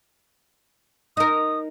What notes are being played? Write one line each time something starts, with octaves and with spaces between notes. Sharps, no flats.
D#4 A#4 D#6